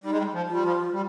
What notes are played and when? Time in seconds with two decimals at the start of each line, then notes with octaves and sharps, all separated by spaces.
0.04 G3 D#4
0.11 G#3
0.18 G3
0.34 F3
0.48 G3 F4
0.63 F3
0.93 G3